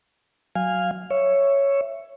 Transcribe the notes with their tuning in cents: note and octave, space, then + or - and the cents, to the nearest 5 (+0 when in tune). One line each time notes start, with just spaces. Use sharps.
F#3 +0 F5 +0 G#5 -15
C#5 +0 E5 +15